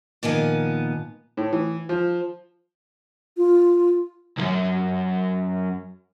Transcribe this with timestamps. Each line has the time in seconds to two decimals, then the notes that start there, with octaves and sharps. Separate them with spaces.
0.23 A#2 D#3 F3 B3 G#5
1.37 A2
1.53 E3
1.89 F3
3.37 F4
4.37 C2 F#2